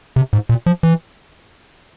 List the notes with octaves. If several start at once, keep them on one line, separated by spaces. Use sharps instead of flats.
C3
G#2
A#2
F3
E3